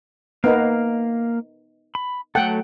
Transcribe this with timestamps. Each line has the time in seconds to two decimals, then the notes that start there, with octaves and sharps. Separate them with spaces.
0.44 A#3 B3 D#4 A#4 F5
1.95 B5
2.35 F#3 A3 A4 F#5 G5